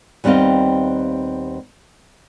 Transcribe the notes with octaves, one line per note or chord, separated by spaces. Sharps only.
D#2 G3 B3 C4 D#5 F5